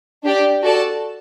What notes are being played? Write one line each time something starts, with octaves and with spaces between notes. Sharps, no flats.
D4 G4 D5
F#4 A4 D5 A5